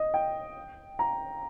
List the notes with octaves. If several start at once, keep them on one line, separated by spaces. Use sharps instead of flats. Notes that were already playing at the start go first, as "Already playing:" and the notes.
Already playing: D#5
G5
A#5